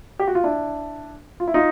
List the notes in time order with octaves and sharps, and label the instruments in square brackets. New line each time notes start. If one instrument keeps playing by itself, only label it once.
[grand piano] G4
F#4
F4
D4 E4
F4
E4
D#4 F4